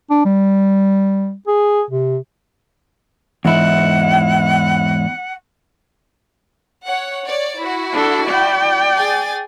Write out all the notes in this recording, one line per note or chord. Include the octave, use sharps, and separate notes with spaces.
D4
G3
G#4
C3
E2 G#2 E4 F#5
C#5 F#5
C#5 D5
E4 F#4
D4 A4
D5 G5
G#4 G#5 A6